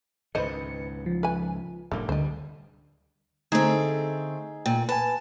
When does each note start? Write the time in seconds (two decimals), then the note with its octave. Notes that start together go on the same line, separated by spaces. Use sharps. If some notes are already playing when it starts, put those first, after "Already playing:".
0.35 C#2 G#2 D#3 B4 C5 D#5 C#7
1.06 F3
1.23 B4 G#5
1.92 F1 A2 D3 G3 A#3
2.09 D2 D3 G3 C5 D#5
3.52 D3 A3 C4 D#4 G#4
4.66 A#2 G5
4.89 B4 G#5 A5